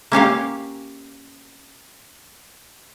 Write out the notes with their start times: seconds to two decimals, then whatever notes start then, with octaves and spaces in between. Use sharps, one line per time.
0.12 A#3 C#4 G4 F5